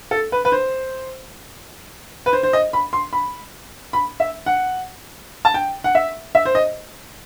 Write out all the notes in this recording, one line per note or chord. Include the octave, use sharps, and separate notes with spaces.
A4
B4
B4
C5
B4
C5
C5
D#5
B5
C6
B5
B5
E5
F#5
A5
G5
F#5
E5
E5
C5
D#5